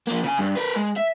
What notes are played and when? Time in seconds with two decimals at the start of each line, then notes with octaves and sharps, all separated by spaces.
0.07 F3 A#3
0.24 C#3 G#5
0.39 G2
0.56 A#4 B4
0.76 G#3
0.97 E5